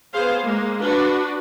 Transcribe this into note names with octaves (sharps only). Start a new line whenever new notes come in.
B3 G#4 C5 F5
G#3 A#3
D4 F#4 B4